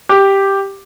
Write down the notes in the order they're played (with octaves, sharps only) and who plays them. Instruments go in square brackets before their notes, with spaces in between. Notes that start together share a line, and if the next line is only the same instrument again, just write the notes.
[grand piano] G4